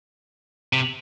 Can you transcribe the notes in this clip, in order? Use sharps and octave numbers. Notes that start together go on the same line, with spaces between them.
C3